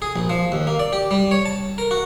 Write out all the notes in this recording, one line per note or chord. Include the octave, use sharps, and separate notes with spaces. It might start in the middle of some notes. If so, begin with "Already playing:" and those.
G#4
A#1
F3
D#2
A#3
D5
G4
G3
C#5
A5
A#4
F#4